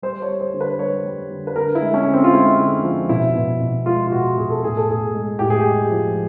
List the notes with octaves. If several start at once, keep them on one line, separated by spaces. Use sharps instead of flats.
G3 C5
C#5
G3
C5
D3
B4
G3 C#5
G3
D3
B4
D3 A#4
E4
G#3
C#4
D3
C4
F4
G#3 E4
D3
F3
B2 E4
B2
B2
G#3 F4
F4
B2 F#4
B2 G#4
A4
A2 G#4
A4
A2 G#4
G#3
A2 G4
G#4
G#3 G4
F3